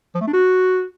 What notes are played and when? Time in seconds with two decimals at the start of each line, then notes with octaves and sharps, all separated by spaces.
0.15 F3
0.21 A3
0.27 D4
0.33 F#4